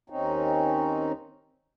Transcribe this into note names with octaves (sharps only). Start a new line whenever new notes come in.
D#2 C4 C#4 D#4